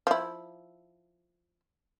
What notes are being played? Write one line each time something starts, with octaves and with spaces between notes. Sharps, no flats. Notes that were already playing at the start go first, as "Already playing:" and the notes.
F3 E4